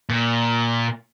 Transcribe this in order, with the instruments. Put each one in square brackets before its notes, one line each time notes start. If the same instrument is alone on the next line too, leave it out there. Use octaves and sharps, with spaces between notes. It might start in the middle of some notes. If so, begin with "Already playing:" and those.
[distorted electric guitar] A#2